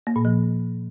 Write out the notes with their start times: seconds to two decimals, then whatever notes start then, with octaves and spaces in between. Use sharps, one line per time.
0.07 A#3
0.16 A#2
0.25 F3